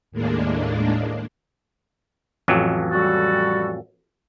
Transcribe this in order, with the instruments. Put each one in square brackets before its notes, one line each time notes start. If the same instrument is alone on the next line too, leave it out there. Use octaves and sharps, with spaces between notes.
[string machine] D#2 A2 G#3 A#3 D4
[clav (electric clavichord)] A1 F2 F#3
[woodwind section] G3 F#4 A4